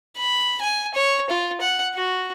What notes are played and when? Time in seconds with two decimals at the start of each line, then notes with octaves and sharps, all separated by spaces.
0.17 B5
0.61 G#5
0.95 C#5
1.30 F4
1.61 F#5
1.94 F#4